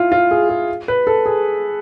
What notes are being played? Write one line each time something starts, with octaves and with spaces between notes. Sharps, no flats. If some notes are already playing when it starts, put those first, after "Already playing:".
Already playing: E4 F4
F4
G#4
G#4
B4
A4
G#4